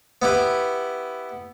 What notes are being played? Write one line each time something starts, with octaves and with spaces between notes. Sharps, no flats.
B3 E4 G4